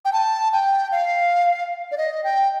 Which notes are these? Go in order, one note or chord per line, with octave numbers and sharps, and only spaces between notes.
G5
A5
G5
F5
D5
D#5
G5